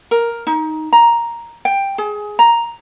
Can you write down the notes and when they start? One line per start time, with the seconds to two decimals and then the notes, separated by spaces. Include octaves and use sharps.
0.11 A#4
0.47 D#4
0.93 A#5
1.65 G5
1.98 G#4
2.39 A#5